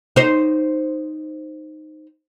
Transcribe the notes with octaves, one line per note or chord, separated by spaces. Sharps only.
D#4 C5